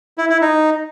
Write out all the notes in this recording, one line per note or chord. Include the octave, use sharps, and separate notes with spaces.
E4
E4
D#4